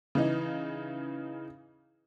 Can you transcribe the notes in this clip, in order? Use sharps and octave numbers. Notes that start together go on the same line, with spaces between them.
C#3 E3 D#4